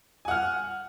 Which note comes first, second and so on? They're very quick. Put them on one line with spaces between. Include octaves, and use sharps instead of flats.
G#5 F#5 F6